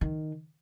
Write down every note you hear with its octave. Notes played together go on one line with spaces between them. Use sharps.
D#3